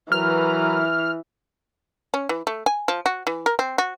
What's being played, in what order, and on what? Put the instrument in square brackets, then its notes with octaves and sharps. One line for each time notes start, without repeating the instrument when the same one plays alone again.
[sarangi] E3 [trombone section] F#3 A#4 B4 [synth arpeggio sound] F6
[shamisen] C#4
E3
A3
G#5
F3
F#4
E3
A#4
C4
F#4